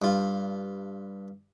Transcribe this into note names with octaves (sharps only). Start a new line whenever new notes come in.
G2 F4